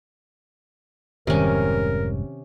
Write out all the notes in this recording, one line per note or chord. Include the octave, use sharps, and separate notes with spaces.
F1 G#2 C3 D#3 G3 C#4 A#4